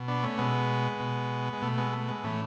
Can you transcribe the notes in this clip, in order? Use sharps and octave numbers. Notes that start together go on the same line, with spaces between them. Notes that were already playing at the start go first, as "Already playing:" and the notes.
Already playing: B2
B3 D4
A3 C#4
B2 G#3 B3
B2
G#3
B2 A3
G#3 B3
A3
G#3 B3
A2 E3 A3 C#4